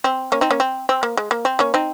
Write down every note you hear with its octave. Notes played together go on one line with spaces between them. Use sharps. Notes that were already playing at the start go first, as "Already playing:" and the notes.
C4
A#3 C#4
C4 D#4
A#3 C#4
C4
C4
A#3
G#3
A#3
C4
A#3 C#4
C4 D#4